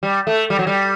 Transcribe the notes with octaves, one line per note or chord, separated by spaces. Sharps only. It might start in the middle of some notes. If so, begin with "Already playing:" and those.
G3
A3
G3
F#3
G3